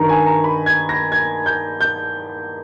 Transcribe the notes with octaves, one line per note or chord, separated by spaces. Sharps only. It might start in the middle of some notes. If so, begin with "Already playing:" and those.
Already playing: G2 D#3 A#5 C#6
G#5
A#5
B5
G#6
A#6
G#6
G6
G6